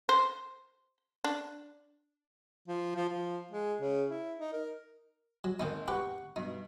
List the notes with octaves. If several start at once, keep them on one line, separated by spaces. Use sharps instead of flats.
C5
D4
F3
F3
F3
G#3
C#3
E4
D#4
A#4
F#3
G#1 D#3 A#3 D#4
G4 B4 F#5 C#6
G2 B2 D#4